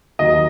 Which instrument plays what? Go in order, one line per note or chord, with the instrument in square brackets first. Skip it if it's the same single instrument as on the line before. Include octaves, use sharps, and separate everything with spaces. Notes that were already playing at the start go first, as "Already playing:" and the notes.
[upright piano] D#2 D#3 F#3 D#5